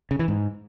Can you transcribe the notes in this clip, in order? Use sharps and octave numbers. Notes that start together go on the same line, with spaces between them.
C#3
E3
G#2